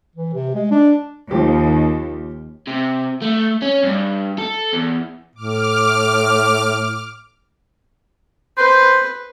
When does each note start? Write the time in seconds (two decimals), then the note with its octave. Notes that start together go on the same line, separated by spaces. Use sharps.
0.15 E3
0.34 C3
0.54 G#3
0.71 D4
1.31 D#2 F3 G4
2.67 C3
3.22 A3
3.62 C#4
3.84 G2
4.38 A4
4.73 E2
5.35 A2 D6 F6
8.57 B4 C5